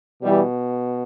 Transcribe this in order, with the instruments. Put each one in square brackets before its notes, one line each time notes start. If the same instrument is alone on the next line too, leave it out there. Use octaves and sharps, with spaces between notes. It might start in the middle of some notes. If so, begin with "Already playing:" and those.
[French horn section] B2 E3 G3